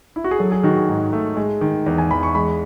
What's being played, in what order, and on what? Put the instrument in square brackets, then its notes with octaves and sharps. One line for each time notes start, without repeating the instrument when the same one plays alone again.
[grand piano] E4
F#4
G#4
F#3 A4
G#4
D#3 F#4
G#4
G#2
A3
G#3
D#3
E2
G#5
E2 B5
C#6
G#3 B5